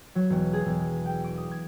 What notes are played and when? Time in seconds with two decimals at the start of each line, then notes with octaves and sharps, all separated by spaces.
0.15 F#3
0.30 E1
0.53 G#4
0.66 E1
1.05 G5
1.24 D6
1.38 D#6
1.51 G#6